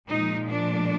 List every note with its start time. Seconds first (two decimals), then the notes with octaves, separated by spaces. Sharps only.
0.11 A#2 F3 G#3 D#4
0.50 D4